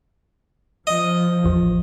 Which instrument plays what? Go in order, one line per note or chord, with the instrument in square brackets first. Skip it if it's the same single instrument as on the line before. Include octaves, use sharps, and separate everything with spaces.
[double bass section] F3 [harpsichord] D#5
[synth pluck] A1 E2 F3